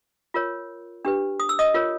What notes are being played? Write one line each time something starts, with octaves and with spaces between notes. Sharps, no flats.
F4 A#4 C#5
D4 G4 B4
D#6
E6
D#5 D#6
F4 A#4 C#5